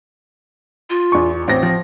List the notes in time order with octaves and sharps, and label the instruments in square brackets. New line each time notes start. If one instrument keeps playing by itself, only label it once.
[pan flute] F4
[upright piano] E2 C#6
[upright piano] A1 C5 A#6 [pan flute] C4
[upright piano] F3